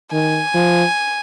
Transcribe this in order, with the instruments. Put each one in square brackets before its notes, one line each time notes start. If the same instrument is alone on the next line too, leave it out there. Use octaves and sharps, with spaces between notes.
[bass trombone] D#3 [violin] G#5
[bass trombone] F3